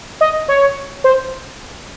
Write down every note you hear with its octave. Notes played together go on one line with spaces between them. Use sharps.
D#5
C#5
C5